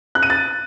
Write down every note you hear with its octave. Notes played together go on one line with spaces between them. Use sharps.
F#6
D#7
A6